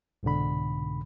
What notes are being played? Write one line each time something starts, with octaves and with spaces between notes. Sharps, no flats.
C2 G#2 B2 D3 B5